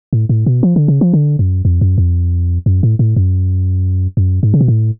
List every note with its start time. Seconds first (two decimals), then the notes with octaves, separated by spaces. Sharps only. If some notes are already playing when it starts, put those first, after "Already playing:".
0.13 A2
0.29 A2
0.46 B2
0.63 F3
0.76 D3
0.88 C#3
1.01 F3
1.13 D3
1.39 F#2
1.65 F2
1.81 F#2
1.98 F2
2.66 F#2
2.83 A2
2.99 A2
3.16 F#2
4.17 F#2
4.43 G#2
4.54 C#3
4.61 B2
4.68 A2